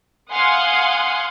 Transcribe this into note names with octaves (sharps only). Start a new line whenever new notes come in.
F5 F#5 G#5 C6 D#6